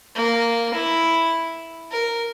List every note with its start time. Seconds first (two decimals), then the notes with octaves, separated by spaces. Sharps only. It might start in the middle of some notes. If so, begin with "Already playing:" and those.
0.15 A#3
0.74 E4
1.91 A#4